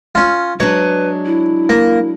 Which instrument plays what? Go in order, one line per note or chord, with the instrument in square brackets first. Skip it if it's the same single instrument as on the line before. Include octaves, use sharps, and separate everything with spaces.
[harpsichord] C#4 F4
[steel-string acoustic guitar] F#3 G#3 D4 [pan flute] B4 [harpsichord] C#5
[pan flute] E4
[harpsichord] A#3